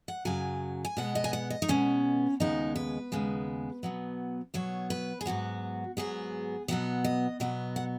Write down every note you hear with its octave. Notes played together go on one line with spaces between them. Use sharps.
F#5
F#2 C#3 F#3 G#5
G#5
B2 G#3 B3 F#5
D#5
G#5
F#5
D#5
D#4
B2 G#3 B3 C#4
D#2 C#3 G#3 B3 D#4
B4
D#2 C#3 G#3 B3
B2 F#3 B3
B2 F#3 B3 C#5
B4
G#4
G#2 F#3 B3 F#4
G#2 F#3 B3 G#4
B2 F#3 B3 F#5
D#5
B2 F#3 B3 D#5
F#5